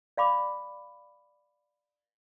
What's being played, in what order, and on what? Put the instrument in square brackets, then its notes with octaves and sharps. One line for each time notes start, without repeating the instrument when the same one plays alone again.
[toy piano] D5 F5 B5 D6